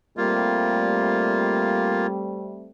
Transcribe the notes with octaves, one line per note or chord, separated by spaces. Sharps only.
G3 A3 A#3 C4 F4